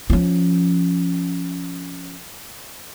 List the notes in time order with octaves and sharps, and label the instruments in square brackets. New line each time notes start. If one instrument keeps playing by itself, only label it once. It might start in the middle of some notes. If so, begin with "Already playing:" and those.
[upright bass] F3 C#4